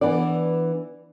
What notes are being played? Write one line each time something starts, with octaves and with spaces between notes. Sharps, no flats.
E3 B3 D4 D5